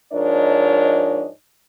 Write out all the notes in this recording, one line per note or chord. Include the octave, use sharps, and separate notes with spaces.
G#2 F3 D4 A#4 C#5 D#5